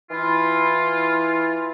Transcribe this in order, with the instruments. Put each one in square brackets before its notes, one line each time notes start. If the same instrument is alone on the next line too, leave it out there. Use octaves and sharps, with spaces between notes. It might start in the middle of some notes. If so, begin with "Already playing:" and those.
[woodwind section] E3 E4 F4